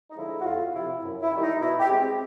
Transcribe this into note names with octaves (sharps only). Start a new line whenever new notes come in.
D#4
D3 F3 G#3 E4
F#4
F2 F4
C3 F3 E4
F#2
E4
D#3 G3
D#4
B2 E4
G4
G#3 C4